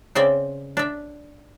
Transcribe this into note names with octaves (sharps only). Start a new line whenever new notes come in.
C#3 C4 C5 D5 E5
D4 E5